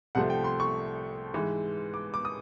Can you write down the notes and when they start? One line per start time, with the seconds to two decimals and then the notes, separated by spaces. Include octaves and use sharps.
0.15 C2 C3 F3 A3 C4 F#5
0.30 G5
0.44 C6
0.60 C#6
1.34 G#2 E3 G#3
1.94 D6
2.14 D6
2.25 D#6